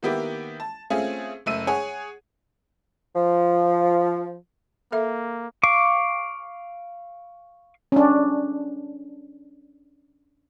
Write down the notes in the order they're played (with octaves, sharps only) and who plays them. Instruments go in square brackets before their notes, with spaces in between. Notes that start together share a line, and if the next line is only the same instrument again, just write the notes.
[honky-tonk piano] D#3 A#3 B3 E4 G4
A5
A3 C4 C#4 F4 G#4
F#1 A3 E6 D#7
G#4 C#5 F#5 G#5
[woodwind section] F3
[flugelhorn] A#3 [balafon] A4 E5
[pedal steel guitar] F5 C#6 D6
[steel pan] C#4 D4